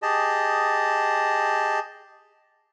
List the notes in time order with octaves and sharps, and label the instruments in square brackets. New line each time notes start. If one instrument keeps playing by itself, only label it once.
[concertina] G4 G#4 D#5 A5